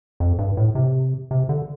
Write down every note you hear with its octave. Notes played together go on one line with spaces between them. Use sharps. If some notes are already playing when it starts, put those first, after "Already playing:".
F2
G2
A2
C3
C3
D3